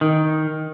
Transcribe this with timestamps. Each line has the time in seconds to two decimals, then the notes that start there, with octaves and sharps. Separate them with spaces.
0.01 D#3